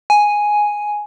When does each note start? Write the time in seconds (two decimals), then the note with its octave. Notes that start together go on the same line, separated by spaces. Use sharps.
0.10 G#5